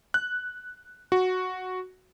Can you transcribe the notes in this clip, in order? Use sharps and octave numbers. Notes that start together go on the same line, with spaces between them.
F#6
F#4